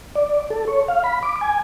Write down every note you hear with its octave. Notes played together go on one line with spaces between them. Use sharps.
D5
A4
C#5
F5
B5
D6
G#5